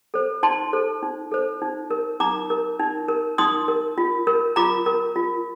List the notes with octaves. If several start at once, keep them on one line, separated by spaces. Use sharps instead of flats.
A4 C5
D#4 A5 C6
A4 C5
D#4
A4 C5
D#4
A#4
D#4 A#5 D6
A#4
D#4
A#4
D#4 C6 D#6
A#4
F4
A#4
F4 A#5 D6
A#4
F4